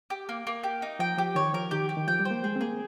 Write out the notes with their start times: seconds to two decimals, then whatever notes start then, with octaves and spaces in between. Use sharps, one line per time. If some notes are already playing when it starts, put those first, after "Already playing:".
0.10 G4
0.29 A#3
0.47 A#3
0.63 G4
0.82 D#4
0.99 F3 G5
1.18 F3 G4
1.35 D#3 C#5
1.54 F3 A#4
1.71 D#3 G4
1.89 G4
1.97 D#3
2.07 F3 G5
2.19 G3
2.25 C5
2.31 A#3
2.43 G#3 G#4
2.56 C4
2.61 A#3 G#4